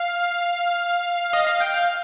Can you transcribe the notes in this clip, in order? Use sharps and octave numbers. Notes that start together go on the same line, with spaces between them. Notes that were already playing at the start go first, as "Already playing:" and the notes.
Already playing: F5
D#5
F5
G5
F5